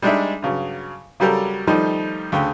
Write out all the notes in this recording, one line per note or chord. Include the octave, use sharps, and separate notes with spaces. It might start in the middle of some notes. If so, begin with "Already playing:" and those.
G3 G#3 D4 D#4 G#4 E5
G2 C#3 F#3
C#3 F#3 G3 G4 A4 A#4
D#3 F3 G3 A3 D#4
D2 C#3 A4 G5